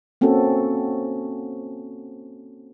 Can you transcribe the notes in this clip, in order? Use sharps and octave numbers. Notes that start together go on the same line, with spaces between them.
A#3 C4 C#4 F#4 A4